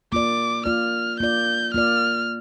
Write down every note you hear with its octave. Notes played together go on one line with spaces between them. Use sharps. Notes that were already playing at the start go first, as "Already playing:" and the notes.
A#3 F4 D5 D6
A#3 F4 D5 F6
A#3 F4 D5 G6
A#3 F4 D5 F6